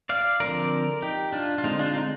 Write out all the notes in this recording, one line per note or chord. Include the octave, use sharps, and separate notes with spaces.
D5 F5
D3 F3 C4 A#4 D5
D#4 G4
D4 F4
F4
D3 G#3 C4 D#4
D4 F4
D#4